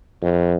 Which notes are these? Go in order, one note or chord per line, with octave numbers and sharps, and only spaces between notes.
F2